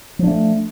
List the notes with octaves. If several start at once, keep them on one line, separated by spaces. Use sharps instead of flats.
F3 A3 D4